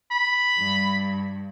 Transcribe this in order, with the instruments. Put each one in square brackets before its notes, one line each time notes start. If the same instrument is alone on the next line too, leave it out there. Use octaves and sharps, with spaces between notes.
[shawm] B5
[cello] G2